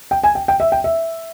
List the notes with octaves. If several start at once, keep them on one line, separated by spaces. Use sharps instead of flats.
G5
G#5
G5
G5
E5
G5
E5